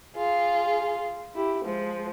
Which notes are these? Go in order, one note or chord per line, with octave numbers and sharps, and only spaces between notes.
F4 G#4
E4 G4
F3 G#3